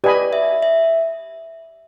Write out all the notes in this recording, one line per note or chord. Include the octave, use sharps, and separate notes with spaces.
G4 B4 D5 D#5 G#5 B5
E5
E5